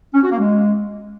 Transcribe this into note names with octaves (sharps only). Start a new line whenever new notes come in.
C#4
F#4
A#3
G#3